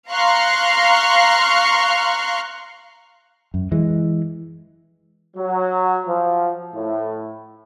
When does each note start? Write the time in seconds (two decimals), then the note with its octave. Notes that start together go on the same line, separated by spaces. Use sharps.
0.10 F5 A#5 C6 C#6 F6 F#6
3.54 F#2
3.72 E3 G#3
5.36 F#3
6.07 F3
6.74 A2